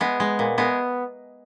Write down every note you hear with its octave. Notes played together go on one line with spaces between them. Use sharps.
G#3 B3
G#3
A#2
G#3 B3